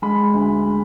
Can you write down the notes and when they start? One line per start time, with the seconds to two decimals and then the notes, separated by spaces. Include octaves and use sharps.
0.02 G#3 B5
0.34 D2